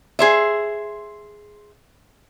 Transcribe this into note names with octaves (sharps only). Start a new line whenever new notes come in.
G#4 C5 E5